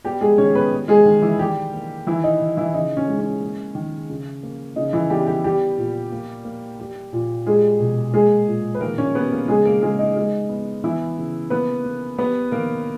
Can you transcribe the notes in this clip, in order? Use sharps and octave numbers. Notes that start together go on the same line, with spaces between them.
G3 B3 G4
G#3 G#4
D#3 C#4 C#5
B3 B4
G3
G#3 G#4
D#3
E3 E4
D#3 G3 G4
A#3
D#3 E3 E4
D#4
D#3
E3 E4
C#3 D#4
C#4
G#3
C#4
A#3
D#3
C#3
A#3
C#3 D#4
E3 E4
G3 B3 G4
G3 G4
G3 B3 G4
A#2
A#3
A#3
G3
A#2
G3 G#3 G#4
B2
G#3 A#3 G#4
A#2
B4
D#3 A#3 A#4
C#4 C#5
G3 B3 B4
A#3 A#4
C#3 G#3 G#4
A#3 A#4
C#3 G#3 G#4
D#4
G#3
B3
E3 B3 E4
C#3
A#3 B3 B4
A#3
G3 B3 B4
D#3 A#3 A#4